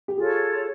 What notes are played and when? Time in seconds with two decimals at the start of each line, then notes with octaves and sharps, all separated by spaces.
0.08 G4
0.17 F4 G#4 A4 C#5